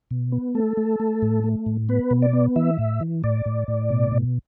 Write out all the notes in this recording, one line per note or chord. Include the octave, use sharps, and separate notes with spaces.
B2
B3
A3 A4
A3
A3
A2
A3
A2
B3 B4
B2
D5
B3
E3 E5
A2
E3
A2 D5
A2
A2
B2
B2